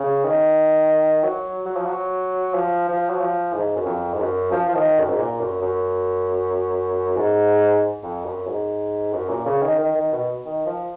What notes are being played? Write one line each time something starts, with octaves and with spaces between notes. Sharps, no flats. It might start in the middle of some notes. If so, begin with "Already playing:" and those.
Already playing: C#3
D#3
F#3
F#3
F3
F#3
F3
F3
F#3
F3
G#2
F#2
F2
G#2
F#2
F3
F3
D#3
F#2
G#2
A#2
F#2
F#2
G#2
F2
F#2
G#2
F#2
A#2
C#3
D#3
D#3
D#3
B2
D#3
F3